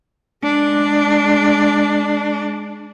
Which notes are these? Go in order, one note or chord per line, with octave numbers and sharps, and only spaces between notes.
G#3 D4